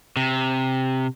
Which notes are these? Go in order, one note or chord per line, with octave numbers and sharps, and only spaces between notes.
C3